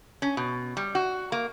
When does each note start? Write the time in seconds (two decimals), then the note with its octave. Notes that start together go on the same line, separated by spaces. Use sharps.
0.22 C#4
0.37 B2
0.77 G3
0.95 F#4
1.32 A#3